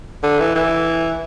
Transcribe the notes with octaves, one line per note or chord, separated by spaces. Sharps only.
D3
E3
E3